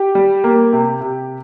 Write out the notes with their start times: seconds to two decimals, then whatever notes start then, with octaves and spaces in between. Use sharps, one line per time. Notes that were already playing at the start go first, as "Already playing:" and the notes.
Already playing: G4 G5
0.15 G3
0.44 A#3
0.73 C3
1.01 C3